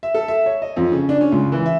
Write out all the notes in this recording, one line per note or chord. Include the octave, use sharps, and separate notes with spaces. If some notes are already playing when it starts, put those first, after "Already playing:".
E5
A4
E5
C#5
D#5
F2
C#3
D4
C#4
C#2
E3
E5